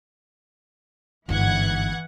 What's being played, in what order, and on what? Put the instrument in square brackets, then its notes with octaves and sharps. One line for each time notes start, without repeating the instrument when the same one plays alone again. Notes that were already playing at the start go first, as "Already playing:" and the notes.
[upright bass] G1 G#2 [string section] E3 F#5 G#6